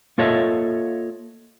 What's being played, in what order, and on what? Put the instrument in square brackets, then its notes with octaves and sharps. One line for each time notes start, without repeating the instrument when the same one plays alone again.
[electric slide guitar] A#3 F4 A4 C#5 D#5 E5